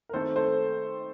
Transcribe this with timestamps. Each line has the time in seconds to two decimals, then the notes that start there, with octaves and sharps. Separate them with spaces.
0.09 A#4
0.13 D#3 A3 C4 A4 C5
0.36 A4 C5